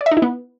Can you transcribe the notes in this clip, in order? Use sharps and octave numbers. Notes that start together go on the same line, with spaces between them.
D5
E5
D#4
E4
B3